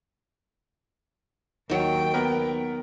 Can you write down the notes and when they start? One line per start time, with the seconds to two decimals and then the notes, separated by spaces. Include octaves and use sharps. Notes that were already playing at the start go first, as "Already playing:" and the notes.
1.70 D#2 D#3 F#3 G5
2.14 B3 A#4